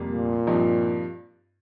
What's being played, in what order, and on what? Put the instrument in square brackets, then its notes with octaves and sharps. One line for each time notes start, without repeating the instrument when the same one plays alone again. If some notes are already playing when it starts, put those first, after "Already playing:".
Already playing: [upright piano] F1 F2 C3 G3 A#3
[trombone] A#2
[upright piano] G2 F3 C4 D#4